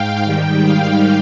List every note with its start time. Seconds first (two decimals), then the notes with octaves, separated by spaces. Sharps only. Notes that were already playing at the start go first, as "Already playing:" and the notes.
Already playing: G#2 F5 G5
0.23 G#2 D#3 G3 G5
0.63 F5